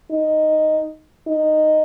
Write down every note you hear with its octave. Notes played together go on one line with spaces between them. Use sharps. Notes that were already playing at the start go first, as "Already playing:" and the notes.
D#4
D#4